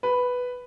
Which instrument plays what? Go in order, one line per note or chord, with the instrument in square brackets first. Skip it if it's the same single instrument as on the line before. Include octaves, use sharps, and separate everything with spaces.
[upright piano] B4